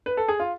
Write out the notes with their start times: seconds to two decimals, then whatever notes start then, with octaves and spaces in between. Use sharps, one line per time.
0.06 B4
0.17 A4
0.28 G#4
0.40 F4